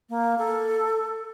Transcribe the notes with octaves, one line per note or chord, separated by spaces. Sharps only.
A#3
A4